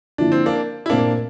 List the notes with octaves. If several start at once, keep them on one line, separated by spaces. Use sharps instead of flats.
D3 F3 A#3 D4 E4
C4
A#3 D4
E4
A#2 A3 A#3 C4 D4